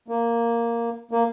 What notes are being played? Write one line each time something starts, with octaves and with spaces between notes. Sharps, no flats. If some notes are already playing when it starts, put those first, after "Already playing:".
A#3
A#3